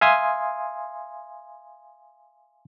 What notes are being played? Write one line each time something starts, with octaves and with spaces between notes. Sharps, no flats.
E5 F5 G#5 C6 D#6